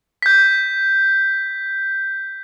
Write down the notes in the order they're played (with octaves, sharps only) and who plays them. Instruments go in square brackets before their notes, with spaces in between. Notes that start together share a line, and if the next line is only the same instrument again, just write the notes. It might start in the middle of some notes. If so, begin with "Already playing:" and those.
[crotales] G6 B6